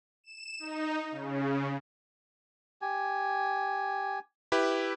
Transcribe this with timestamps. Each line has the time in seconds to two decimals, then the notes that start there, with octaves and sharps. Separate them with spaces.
0.24 E7
0.60 D#4
1.11 C#3
2.82 G4 G#5
4.52 E4 G4 B4